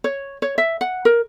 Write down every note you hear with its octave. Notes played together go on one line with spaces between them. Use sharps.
C#5
C#5
E5
F#5
A#4